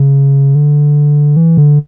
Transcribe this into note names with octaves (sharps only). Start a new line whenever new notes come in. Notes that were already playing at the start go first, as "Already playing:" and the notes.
Already playing: C#3
D3
E3
D3